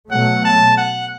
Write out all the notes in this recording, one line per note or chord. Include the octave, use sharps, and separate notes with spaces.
B2 F#3 A3 F#5
A5
F#5